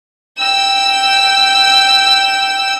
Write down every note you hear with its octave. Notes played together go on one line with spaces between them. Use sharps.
G5 E6